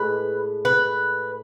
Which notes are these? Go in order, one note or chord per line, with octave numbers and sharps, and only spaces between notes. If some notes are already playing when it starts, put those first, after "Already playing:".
Already playing: A2 G#3 B4
B4